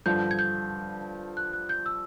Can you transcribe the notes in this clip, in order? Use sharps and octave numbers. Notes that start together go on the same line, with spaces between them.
G2 D3 F3 G6
G#6
G6
F#6
F#6
G6
E6